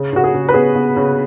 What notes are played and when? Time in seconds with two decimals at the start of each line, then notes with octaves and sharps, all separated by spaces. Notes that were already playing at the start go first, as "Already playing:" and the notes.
Already playing: C#3
0.13 C#3 F#4
0.24 G#4
0.34 C#3
0.49 B4
0.54 B3 G#4
0.75 B3
0.97 C#3